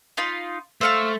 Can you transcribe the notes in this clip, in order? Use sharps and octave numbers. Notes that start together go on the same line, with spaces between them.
D#4 F4 B5
A3 C5 F5 C#6 E6